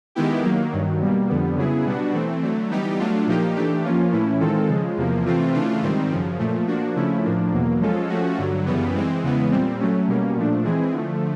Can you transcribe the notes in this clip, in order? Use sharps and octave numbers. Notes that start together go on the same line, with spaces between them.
D#3 G#3 B3 E4 G4
D#3 F#3 A#3
G2 D#3 F#3
B2 G3 A#3
F2 D3 G3 B3
C#3 F#3 B3 E4 G#4
B2 G3 B3 D4 F#4
E3 A3 C4
D3 F#3 A3
E3 G3 B3 D#4 G4
F#3 A3 D4 F4
A#2 F3 A#3 D#4 G4
E3 A3 D4 G4
F3 A#3 C#4 F4
A2 E3 A3 C#4 E4
D#3 G#3 C4 F4 A4
C#3 F3 G#3
E2 C3 F3 A#3
C3 E3 A3 C4 F4
C#3 E3 A3 D4 F4
G#2 D#3 G3 C4
F#2 C#3 F3
A#2 F3 A3
F3 A#3 D4 F#4
C#3 F3 A3 C#4 E4
A2 F3 A#3 D4
E2 B2 F#3 A#3
F3 G#3 C#4 F4 A4
F3 A3 C#4 F#4
G2 D3 F#3
F#2 C#3 E3 G3 B3
E3 G#3 C4
E2 C#3 E3 G#3 B3
A#2 G3 C4
F#3 A3 C#4
B2 G3 A#3 C#4
A#2 F3 A3 D4
E3 G#3 C4 E4 G#4
D3 F3 A3